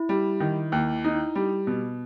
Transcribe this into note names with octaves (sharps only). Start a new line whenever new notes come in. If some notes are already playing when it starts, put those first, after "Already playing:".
Already playing: E4
G3
D#3
D#2
D#4
G3
B2